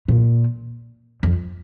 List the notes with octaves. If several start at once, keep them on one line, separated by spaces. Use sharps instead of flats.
A#2
F2